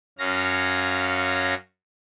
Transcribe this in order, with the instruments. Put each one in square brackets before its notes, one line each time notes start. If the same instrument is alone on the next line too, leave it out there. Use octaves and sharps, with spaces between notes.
[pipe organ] F#2 C#4 F5 A#6